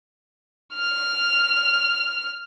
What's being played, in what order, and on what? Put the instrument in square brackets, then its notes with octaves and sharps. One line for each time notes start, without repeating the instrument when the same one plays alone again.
[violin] F6 F7